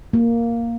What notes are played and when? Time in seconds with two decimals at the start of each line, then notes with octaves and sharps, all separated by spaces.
0.13 A#3